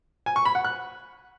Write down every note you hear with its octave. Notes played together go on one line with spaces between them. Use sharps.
G#5
C#6
B5
F#5
F#6